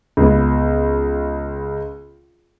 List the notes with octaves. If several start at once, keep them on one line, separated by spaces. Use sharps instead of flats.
C#2 B3